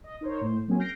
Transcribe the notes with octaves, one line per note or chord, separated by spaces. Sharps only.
D#5
D#4 A#4 C5 C#5
A2 C5
F#3 A#3 C4 C#4 F#4 G#4
F6 G6 A#6 C7 D7